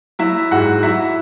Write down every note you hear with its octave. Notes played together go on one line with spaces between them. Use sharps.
F#3 E4 E5
G#2 F#4 F#5
F#3 E4 E5